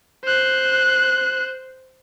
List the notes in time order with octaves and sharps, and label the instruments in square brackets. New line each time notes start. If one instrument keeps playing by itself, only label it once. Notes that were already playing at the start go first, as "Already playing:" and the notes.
[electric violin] C5 F#6